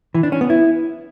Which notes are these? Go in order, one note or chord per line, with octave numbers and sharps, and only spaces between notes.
E3
D4
C#4
B3
E4